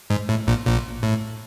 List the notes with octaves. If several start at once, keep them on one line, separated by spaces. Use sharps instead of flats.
G#2
A2
A#1 A#2
A#1 A#2
A2